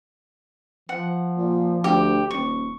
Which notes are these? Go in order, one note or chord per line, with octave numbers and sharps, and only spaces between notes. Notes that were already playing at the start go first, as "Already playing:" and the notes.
F3 F#5
A#2
D2 G4
D#1 C#6